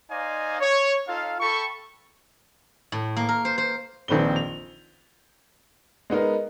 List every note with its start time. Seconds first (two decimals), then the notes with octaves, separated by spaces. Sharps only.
0.10 D#4 C5 D5 D#5 F5 G#5
0.61 C#5
1.08 D#4 F4 A4 F5
1.40 A4 G5 B5 C#6
2.92 A2
3.17 A#3
3.29 A#4
3.45 C5
3.58 C5
4.08 A#1 D#3 C4 B4 G7
4.36 F7
6.10 G#3 B3 D#4 A#4